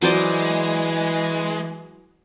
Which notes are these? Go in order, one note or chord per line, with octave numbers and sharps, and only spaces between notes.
E3 F#3 G#3 C5 D5